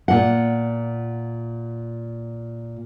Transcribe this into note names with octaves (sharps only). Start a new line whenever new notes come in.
A#2 F#5